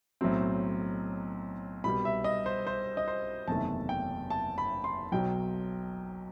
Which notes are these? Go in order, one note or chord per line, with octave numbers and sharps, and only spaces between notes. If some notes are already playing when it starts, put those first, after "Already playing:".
B1 A2 F#3 C4
C2 B2 G3 B5
E5
D#5
C5
C5
D#5
C5
F#1 E2 C3 D#3 A3 A5
G5
A5
B5
C6
B1 B2 F#3 G5